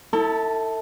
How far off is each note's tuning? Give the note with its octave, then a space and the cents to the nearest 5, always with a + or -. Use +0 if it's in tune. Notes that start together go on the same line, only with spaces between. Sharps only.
E4 -25 A4 +35 A5 +0